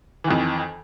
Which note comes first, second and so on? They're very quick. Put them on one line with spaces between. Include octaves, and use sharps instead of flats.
E3 D#3 F2